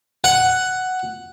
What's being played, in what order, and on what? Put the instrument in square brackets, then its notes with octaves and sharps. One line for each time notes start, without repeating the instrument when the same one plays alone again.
[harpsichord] F#5